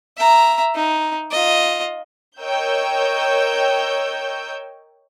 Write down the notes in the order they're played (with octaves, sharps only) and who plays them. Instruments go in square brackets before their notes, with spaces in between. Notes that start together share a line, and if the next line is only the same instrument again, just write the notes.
[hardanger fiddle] E5 A#5
D#4
F4 D#5
[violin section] A#4 C#5 D#5 G5 E6 G6